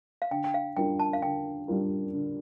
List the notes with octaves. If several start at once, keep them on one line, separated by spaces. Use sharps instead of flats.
F5
D3 G5
G5
F5
G3 D4 F4 A#4 G5
A5
F5
D3 G5
G3 D4 F4 A#4
D3